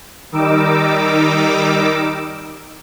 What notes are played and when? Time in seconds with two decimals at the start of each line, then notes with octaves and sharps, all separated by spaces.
0.32 D#3 G3 D#4 A#4 D6 E6